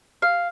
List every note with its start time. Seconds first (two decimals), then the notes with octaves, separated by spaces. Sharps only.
0.22 F5